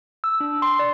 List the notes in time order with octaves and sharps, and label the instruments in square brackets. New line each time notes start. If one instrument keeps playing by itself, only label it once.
[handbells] E6
D4
C6
D5